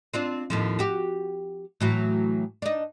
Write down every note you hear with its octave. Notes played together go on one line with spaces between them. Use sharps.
C4 D4 F4
D#2 A2 F3
F#4 G4
A2 E3 F#3
D4 D#4